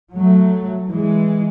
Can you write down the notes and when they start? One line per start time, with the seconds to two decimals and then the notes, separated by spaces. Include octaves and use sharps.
0.13 F#3 A3
0.89 E3 G#3